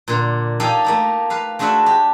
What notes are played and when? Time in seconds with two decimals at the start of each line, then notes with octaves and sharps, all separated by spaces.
0.08 A#2 D3
0.60 D#4 G4 A4 D5 F5 G#5
0.84 A3 A#3 D#4
1.30 B4 F5
1.59 G#3 A3 D4 F#4 E5 F#5
1.86 G4